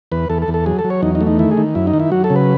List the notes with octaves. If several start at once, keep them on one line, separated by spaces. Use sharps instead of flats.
E2 B4
E2 A4
A4
E2
A4
F#3 G#4
A4
F#3
C#5
E2 D#4
D#4
A3
D#4
D#3 E4
G#4
D#3
F#2 E4
D#4
D#3
E4
F#3 F#4
A4
C#3
B4